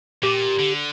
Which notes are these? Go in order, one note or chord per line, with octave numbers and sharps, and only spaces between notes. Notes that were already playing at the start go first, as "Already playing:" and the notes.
A#2 G4
D3